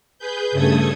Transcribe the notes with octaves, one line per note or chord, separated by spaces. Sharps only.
G#4 B4 G6
G2 C#3 A3 A4 D#6 G#6